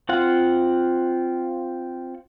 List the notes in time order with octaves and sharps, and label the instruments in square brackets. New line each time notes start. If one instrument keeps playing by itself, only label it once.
[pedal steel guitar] C4 F4 F#5